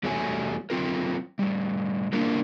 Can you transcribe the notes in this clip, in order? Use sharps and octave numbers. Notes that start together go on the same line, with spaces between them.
E2 G3 A3 F#4 C#5 G#5
F#3 C4 F4 A#4
A2 G3
G3 A#3 D4 E4 F4 A#4